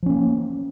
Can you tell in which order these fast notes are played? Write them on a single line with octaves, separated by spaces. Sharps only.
F3 C#4 A#3